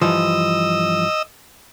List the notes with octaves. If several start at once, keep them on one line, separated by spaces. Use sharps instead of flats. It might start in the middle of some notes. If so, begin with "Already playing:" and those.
G2 E3 F3 D#5 E6